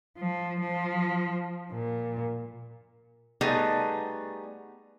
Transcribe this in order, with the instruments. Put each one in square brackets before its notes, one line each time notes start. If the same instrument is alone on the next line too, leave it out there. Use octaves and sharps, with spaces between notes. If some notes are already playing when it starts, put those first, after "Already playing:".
[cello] F3
F3
A#2
[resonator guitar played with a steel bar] G3 A3 B3 D#4 G#4 A5